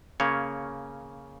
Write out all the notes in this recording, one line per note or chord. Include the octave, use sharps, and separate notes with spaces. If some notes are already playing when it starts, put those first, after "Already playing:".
C#3 A#3 C#4 C#5